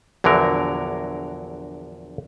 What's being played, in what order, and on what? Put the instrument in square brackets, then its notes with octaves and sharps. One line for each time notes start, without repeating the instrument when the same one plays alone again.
[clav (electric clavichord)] A#1 E2 D3 F#3 A#4